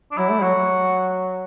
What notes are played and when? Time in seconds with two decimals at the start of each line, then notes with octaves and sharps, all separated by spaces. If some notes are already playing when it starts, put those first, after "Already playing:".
0.12 D4
0.18 F#3 E4
0.30 A3
0.42 F#3 F#4
0.55 F#3